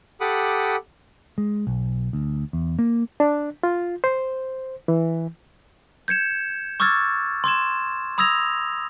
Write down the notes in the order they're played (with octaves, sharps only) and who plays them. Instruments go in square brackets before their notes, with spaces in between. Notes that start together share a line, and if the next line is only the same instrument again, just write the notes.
[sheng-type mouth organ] G4 A4 F#5 B5 D6 D#6
[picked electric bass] G#3
B1
D2
E2
A#3
[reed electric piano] D4
F4
C5
E3
[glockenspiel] G6 G#6 C#7 E7
C#6 D6 E6 F6 G#6 A6
C6 D6 G#6 E7
B5 D#6 E6 G#6 A#6 F7